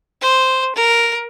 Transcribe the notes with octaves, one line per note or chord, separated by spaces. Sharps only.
C5
A#4